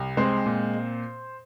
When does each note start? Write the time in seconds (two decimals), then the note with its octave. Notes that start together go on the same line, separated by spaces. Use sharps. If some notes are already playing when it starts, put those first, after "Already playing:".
Already playing: C2
0.17 G#3 C4 C5
0.46 A#2